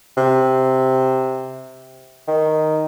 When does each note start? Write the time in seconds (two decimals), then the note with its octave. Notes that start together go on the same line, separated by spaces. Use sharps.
0.17 C3
2.28 D#3